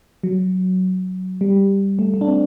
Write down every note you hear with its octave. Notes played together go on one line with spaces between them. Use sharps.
F#3
G3
A3
A3
D4
C4